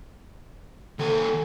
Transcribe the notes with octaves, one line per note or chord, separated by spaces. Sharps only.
D#2 A4 G#5